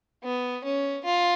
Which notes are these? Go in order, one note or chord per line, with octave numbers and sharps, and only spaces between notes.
B3
C#4
F4